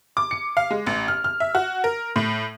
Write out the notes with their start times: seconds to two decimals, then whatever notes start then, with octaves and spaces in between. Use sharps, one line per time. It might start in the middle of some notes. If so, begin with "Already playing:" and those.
0.17 D6
0.31 C#7
0.57 F5
0.71 G#3
0.87 A1
1.08 F6
1.24 F6
1.40 E5
1.55 F#4
1.84 A#4
2.16 A2